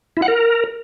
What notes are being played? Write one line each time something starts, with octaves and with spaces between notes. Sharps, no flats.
E4
F#5
A#4